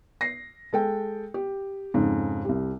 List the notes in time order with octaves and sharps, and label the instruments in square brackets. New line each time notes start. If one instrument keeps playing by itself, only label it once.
[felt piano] A#6 C7
G#3 A4 G5
G4
F2 G#2 C#3
C2 G3